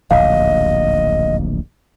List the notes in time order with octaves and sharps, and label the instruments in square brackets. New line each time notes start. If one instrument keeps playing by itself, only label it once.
[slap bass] D1 A#1 D#2 [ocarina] D#5 [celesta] F5